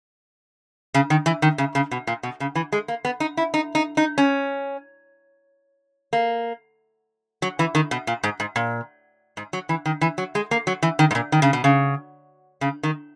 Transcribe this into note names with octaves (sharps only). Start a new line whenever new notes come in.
C#3
D#3
E3
D#3
C#3
C#3
B2
A#2
B2
C#3
E3
G#3
A#3
B3
D#4
E4
D#4
D#4
D#4
C#4
A#3
F#3
E3
D#3
B2
A#2
G#2
G#2
A#2
G#2
F#3
E3
D#3
E3
F#3
G#3
A#3
F#3
E3
D#3
G#2
A#2
D#3
C#3
B2
C#3
C#3
D#3